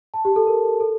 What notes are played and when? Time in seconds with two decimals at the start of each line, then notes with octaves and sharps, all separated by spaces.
0.14 A5
0.25 G4
0.36 A4
0.47 A#4
0.80 A4